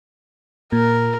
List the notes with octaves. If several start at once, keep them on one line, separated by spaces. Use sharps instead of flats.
A#2 A#4